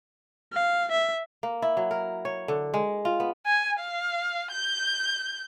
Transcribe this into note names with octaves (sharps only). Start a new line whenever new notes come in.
F5
E5
A#3
E4
F#3
A#4
C#5
D3
G#3
F4
B3
G#5
F5
G6